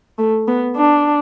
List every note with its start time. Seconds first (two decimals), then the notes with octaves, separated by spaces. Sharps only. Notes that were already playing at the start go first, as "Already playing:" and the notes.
0.18 A3
0.48 B3
0.76 D4